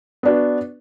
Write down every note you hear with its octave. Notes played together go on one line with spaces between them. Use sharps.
B3 D4 F#4